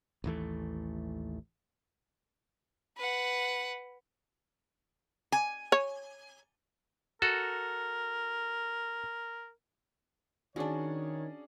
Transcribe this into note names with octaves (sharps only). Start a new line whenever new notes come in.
A1 D#2 E3 A3
B4 F#5
G#5
C#5
F#4 A4 A#4
D#3 C#4 D4 F#4 G#4 C#5 D5